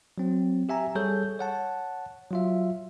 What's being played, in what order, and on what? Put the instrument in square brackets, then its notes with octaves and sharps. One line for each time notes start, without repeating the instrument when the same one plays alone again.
[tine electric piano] F#3 C4
G4 E5 G#5 A#5
G3 G#4 A4 C#5 G6
C#5 F#5 A5
F#3 F4 E5